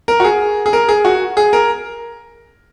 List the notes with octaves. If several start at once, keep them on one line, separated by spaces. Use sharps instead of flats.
A#4
F#4
G#4
G#4
A#4
G#4
F#4
G#4
A#4